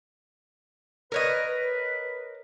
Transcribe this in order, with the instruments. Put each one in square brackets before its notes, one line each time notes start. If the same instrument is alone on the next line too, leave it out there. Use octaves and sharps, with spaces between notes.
[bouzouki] A#4 C#5 D#5 [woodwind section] B4